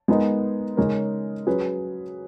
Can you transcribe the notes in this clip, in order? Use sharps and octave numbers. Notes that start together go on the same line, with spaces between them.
G#3 B3 D#4 A#4
C#3 G#3 D#4 A#4 C#5
F#3 C#4 G#4 B4